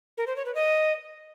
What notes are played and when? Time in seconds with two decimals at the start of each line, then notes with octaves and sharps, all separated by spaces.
0.18 A#4
0.27 C5
0.36 C#5
0.46 B4
0.55 D#5